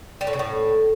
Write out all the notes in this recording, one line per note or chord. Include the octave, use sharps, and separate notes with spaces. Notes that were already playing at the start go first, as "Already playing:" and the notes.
G3
A2
C#3
A2